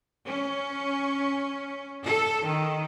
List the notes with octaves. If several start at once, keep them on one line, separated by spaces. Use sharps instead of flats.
C#4
A4
D#3